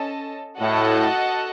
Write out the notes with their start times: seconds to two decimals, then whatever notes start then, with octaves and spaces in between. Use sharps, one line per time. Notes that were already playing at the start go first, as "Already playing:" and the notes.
Already playing: C#4 A4 D#5 A5
0.60 A2 F#4 A4 D#5 F#5 A5